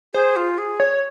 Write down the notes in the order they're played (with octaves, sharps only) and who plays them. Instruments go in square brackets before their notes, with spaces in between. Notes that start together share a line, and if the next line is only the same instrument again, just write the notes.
[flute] G#4 [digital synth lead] C5
[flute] F4
G#4
[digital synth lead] C#5